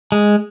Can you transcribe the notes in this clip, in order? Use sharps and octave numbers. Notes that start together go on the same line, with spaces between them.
G#3